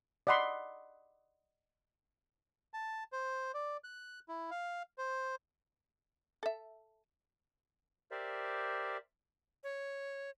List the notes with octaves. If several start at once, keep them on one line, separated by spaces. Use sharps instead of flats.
D5 D#5 F#5 B5 C6
A5
C5
D5
F#6
E4
F5
C5
A4 E5
G4 A#4 C5 D5 E5
C#5